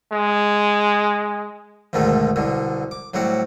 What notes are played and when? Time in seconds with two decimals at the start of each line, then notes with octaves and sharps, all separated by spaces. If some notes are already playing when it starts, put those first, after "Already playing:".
0.12 G#3
1.93 D2 G#2 B2 D#3 A3
2.36 C2 B2 D3
2.91 D6
3.14 A2 F#3 G3 C4 F#5